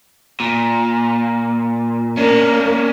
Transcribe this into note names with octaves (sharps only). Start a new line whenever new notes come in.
A#2
A#3 C#4 D4